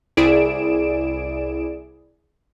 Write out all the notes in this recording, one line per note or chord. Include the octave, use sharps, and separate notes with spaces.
C2 E4 G#4 D5 D7 E7